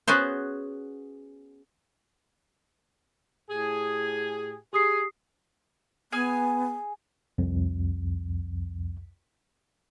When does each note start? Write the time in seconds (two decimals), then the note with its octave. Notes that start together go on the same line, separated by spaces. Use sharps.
0.07 B3 C#4 F#4 G#4 C5
3.49 A2 G4 G#4
4.73 G4 G#4 D#6 C7
6.12 B3 G#4 G#5 F6
7.38 C2 F2